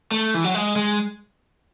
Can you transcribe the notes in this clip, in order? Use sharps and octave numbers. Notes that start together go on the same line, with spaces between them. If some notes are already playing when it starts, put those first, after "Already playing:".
A3
E3
F#3
G#3
G#3